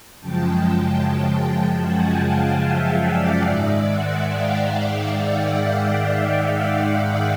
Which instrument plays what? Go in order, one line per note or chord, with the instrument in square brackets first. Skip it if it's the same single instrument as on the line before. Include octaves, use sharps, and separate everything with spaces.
[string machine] F#2 C#3 F3 G#3 G5 A5
F#5 G#5
F5 G5
E5 F#5
D5 E5
G#2 D#3 G#3 D5 E5
E5 F#5
F5 G5
F5 G5